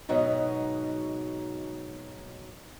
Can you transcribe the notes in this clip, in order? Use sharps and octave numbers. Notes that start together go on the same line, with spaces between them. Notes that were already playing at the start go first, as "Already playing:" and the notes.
G#2 B2 F#3 D#4